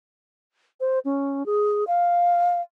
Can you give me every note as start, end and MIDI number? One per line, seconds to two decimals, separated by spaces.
0.80 0.99 72
1.05 1.46 61
1.46 1.84 68
1.87 2.61 77